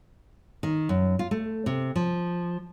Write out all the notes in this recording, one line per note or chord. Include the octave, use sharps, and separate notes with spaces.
D#3
F#2
F4
A3
C3
F3